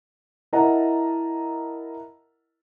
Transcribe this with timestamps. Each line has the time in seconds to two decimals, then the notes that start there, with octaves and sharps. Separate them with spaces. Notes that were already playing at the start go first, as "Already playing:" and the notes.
0.53 E4 A#4 D#5 F#5 A5 A#5